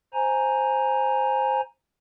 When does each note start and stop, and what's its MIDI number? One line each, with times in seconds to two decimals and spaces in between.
0.13 1.61 72
0.13 1.61 80
0.13 1.61 82